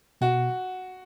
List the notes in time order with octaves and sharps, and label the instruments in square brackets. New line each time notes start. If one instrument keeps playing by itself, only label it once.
[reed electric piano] B2 [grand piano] F#4